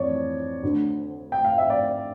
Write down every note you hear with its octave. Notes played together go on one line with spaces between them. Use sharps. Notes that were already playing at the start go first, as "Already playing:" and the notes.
Already playing: F2 E3 C#5 D5
D2 D3
G5
F5
E5
D5